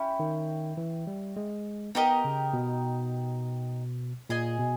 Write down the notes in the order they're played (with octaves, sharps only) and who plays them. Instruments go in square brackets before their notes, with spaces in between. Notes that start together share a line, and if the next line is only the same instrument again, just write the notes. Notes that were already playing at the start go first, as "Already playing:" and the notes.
Already playing: [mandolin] C#4 E4 G4
[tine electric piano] D#3
E3
G3
G#3
[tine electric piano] B3 [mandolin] D#4 G4 A#4 D#5
[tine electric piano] C#3
B2
[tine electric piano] A#2 [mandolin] G#4 D#5 G#5
[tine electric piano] B2